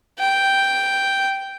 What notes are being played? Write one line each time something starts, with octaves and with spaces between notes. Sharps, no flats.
G5